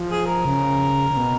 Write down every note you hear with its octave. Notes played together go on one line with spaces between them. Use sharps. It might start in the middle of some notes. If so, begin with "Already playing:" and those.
Already playing: F3
G#4
A#4
C#3
C#3
B2